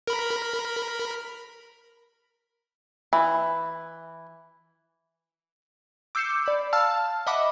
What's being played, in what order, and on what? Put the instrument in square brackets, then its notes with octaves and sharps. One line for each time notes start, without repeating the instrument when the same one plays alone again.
[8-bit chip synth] A#4 B5
[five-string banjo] E3
[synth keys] D6 E6 G6 C7 C#7 E7
D5 B5
F5 A5 E6 F6
D#5 E5 F#5 B5 D6